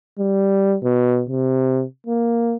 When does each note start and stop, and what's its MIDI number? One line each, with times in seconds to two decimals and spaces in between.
0.19 0.76 55
0.84 1.23 47
1.30 1.83 48
2.07 2.57 58